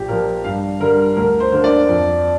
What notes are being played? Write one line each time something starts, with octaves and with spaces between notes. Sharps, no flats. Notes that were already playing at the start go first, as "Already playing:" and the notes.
Already playing: A#1 G4
A#2 F3 A#4
G2 F5
D3 G3 A#4
D2 A#4
C5
D3 A#3 D4
D5
F2